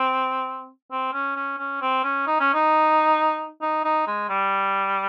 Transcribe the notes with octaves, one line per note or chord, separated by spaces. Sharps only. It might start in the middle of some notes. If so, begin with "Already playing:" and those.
Already playing: C4
C4
C#4
C#4
C#4
C4
C#4
D#4
C#4
D#4
D#4
D#4
G#3
G3